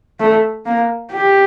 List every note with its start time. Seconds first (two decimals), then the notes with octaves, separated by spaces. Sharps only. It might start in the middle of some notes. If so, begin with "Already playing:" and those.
0.20 A3
0.66 A#3
1.11 G4